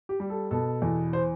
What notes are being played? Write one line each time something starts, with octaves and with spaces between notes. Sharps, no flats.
G4
G3
A4
B2 A4
E2
C5